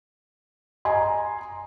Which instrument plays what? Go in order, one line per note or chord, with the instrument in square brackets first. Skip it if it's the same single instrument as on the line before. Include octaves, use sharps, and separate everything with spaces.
[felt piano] D#5 G#5 A#5 C6